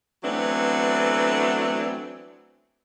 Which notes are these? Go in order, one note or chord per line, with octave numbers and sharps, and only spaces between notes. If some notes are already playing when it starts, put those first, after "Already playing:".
E3 F#3 A3 B3 C4 D4